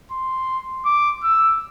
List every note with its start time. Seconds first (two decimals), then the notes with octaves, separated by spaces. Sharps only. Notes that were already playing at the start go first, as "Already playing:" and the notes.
0.12 C6
0.85 D6
1.23 E6